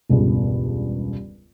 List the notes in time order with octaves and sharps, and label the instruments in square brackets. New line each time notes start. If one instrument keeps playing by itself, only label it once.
[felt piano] E1 C#2 G2